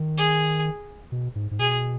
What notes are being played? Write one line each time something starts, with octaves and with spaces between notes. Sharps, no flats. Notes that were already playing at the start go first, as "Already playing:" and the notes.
Already playing: D#3
G#4
B2
G#2
G#2
B2 G#4